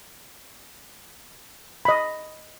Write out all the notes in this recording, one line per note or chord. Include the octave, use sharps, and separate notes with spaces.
D#5 B5